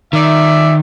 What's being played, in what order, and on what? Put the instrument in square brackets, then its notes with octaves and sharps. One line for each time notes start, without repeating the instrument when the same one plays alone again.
[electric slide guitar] D#3 [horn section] D5 E5